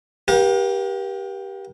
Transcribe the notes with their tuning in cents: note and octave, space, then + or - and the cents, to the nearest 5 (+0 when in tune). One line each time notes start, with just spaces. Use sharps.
G4 +0 A#4 +45 F5 +45